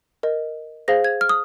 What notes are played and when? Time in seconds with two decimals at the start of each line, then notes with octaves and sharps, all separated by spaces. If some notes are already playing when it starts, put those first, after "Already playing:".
0.23 A#4 D#5
0.88 G#4 C5 F5 A#6
1.04 G#6
1.21 F6
1.29 D#6